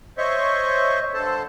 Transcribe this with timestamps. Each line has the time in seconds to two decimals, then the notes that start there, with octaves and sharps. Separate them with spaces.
0.18 C5 C#5 D#5 E5 C#6
1.14 G2 D3 A4 C5 A5